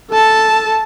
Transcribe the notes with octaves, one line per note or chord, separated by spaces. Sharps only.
A4 A5